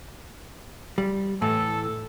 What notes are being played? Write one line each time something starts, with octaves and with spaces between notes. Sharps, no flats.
G3
A2 E3 A4